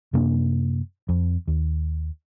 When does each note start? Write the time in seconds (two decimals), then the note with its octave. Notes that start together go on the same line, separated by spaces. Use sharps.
0.13 F#2 C3 A#3 D4
1.09 F2
1.48 D#2